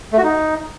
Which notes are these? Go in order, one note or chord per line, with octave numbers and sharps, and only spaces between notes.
A3
F#4
D#4